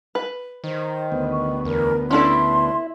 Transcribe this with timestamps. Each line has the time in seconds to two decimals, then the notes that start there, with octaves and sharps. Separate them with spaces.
0.15 B4
0.64 D#3 C5
1.12 D2 B3
1.31 C#6
1.65 E2 A#4
2.11 C#4 D4 E4 A4 C6